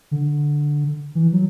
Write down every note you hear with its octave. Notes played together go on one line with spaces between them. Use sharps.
D3
E3
F#3